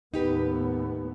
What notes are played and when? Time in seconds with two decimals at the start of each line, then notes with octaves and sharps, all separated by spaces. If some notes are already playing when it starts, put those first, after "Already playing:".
0.14 D#2 A2 B3 D#4 G4 B4